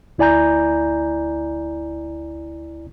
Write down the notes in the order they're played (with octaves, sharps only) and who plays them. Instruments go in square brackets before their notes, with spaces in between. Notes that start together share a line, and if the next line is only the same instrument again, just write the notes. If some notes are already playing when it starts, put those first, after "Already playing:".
[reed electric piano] D2 E4 D5 G#5 A#5 G6